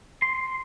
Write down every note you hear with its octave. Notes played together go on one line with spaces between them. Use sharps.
C6